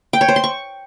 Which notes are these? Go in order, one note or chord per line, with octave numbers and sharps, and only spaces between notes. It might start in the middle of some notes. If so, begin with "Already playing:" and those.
G5
C#5
C5
C6
C#6